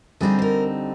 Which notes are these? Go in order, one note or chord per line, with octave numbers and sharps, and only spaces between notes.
D3 G3 C4 D#4 G#4
C5
A#4